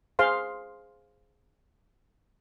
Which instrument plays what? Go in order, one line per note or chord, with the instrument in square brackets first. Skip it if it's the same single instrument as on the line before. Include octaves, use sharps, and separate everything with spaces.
[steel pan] G#4 C5 F5 C6